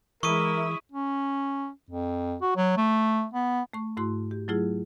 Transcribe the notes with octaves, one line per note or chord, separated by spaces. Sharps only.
E3 G#3 E4 A#4 E5 C#6 D#6 D#7
C#4
F2
F#4
F#3
A3
B3
A3 C#6
G#2 A3 E4 F#4 C6
G4
F#3 A3 E4 F4 G#4